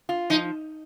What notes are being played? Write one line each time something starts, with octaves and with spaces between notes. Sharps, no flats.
F4
F3 D#4